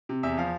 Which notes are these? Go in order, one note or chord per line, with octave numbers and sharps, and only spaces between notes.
C3
E2 E5
F3 F5